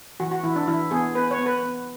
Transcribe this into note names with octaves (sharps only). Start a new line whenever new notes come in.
E3 F#4
F#4
E3 E4
D4
E3 E4
B3 G#4
B3 B4
C#5
B3
B4
B3